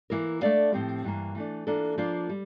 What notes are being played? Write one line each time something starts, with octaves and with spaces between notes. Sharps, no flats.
E3 A#3 E4 A#4
A3 D4 A4 D5 F5
A2 F3 C4 G4
G2 E3 A#3
E3 A3 D4
E3 A#3 D4 F4 A4
F3 A#3 D4 F4
G3